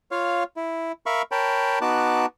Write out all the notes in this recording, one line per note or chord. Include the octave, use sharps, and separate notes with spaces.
F4 C#5 F5
E4
A#4 E5 F5 B5 C#6
A#4 C#5 G5 A5 B5
B3 D#4 F#4 A5 D6 F#6